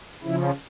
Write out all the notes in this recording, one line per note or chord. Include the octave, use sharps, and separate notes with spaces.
C#3 F3 E4